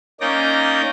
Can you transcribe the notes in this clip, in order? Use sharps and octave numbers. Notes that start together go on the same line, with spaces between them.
A#3 C#4 D#4 D5 G6 A#6